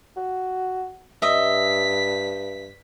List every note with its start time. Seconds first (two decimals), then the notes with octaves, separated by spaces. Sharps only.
0.17 F#4
1.22 G2 D#5 E5 B6